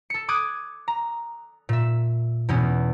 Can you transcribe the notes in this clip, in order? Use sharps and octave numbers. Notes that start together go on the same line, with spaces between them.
A4 C#7
D6 D#6 F#6 G#6
A#5
A#2 E5
E2 B2 B3 C#4